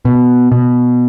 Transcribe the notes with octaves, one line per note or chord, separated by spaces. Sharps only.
B2
B2